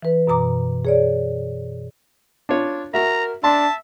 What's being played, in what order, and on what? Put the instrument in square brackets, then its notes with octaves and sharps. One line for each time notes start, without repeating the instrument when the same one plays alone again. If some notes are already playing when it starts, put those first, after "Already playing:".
[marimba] E3 B4
F#2 B2 A#5 D6
G#4 C#5 D5
[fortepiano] D4 F4 C#5
[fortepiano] F#4 E5 [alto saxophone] A#4 [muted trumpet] A#5
[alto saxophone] D4 [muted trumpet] E5 [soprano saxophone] A5 [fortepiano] C6